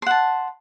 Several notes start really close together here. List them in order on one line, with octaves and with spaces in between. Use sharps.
C6 F#5 A5